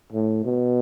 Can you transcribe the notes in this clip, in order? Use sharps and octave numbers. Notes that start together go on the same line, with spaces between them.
A2
B2